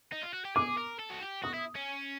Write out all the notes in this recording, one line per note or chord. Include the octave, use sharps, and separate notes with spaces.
D#4
F4
F#4
G4
G#4 D6
A#4
A4
F#4
G4
F#4 D#6
E4
C#4